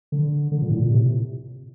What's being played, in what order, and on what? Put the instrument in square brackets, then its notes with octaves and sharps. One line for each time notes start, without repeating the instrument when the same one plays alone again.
[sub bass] D3
D3
A#2
A2
A#2
C3